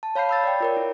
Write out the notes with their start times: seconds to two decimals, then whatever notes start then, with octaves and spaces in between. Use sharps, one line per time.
0.03 A5
0.15 C#5 F5 B5 G6 C7
0.29 B5 E6 A6
0.44 D5 G5
0.60 F4 A#4 C#5
0.77 E4